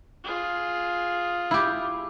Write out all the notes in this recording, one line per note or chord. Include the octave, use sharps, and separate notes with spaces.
F4 G#4
E4 G4